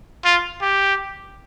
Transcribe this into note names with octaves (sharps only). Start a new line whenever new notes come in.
F4
G4